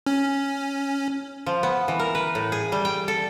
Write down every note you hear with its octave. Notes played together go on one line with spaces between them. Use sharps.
C#4
F3
B3
E3
A#4
B4
A2
G#4
G3
G5
A4